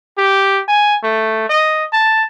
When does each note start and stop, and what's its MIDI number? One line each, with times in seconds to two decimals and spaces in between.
0.18 0.62 67
0.68 0.95 80
1.03 1.45 57
1.49 1.85 75
1.93 2.23 81